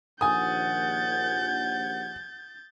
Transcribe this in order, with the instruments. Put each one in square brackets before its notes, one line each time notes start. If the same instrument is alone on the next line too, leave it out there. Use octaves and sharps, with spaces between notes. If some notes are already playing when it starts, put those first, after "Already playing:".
[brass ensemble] A#1 D#2 F#5 [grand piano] G#5 D#6 [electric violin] G6 A6